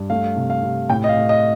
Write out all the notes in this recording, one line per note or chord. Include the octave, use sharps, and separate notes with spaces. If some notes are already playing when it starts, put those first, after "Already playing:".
Already playing: G2
A3 F5
C3
F5
C3
A2 G5
D#5
F5
A2
D#5